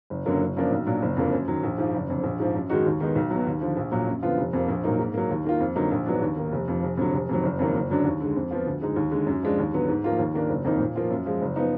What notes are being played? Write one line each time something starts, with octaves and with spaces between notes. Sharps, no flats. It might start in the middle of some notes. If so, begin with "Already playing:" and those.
F#1
F#2 D3 F#3 A#3
F#1
F#2 F3 A#3 D4
B1
A#2 F#3 D4
F#1
F2 D3 F3 A#3
F#2
D#3 F#3
A#1
G#2 F3
F#1
F2 D3
A#1
G#2 F3
F#2
D#3 G#3 D#4 F#4
D#2
D#3 G#3 B3 D#4
B1
B2 F#3
D#2
D3 F3
A#1
A#2 F#3
F#2
D3 F3 B3 F4
F1
F2 F3 A#3
A#1
A#2 F#3 A#3 D#4
G#2
F#3 A#3
D#2
D#3 A#3 F4
F2
D3 F#3 A#3 D#4
A#1
G#2 F#3 B3 D4
D#2
D#3 A#3
F1
F2 F3
F1
F2 D3 F#3
F1
F2 D#3 F#3
F#1
F2 D#3 F#3 A#3
F#1
F#2 D3 F#3 D4
D#2
D3 G#3
F2
F3 B3 F4
D2
D3 G#3 D#4
D#2
D3 G#3
F#2
F3 G#3 D4
D#2
D3 F#3 B3
G#2
F3 A#3 F4
D#2
D#3 A#3 D4
F#1
F2 D#3 A#3 D#4
A#2
F3 A#3 F4
F#2
F3 G#3
F#1
F3 B3 D#4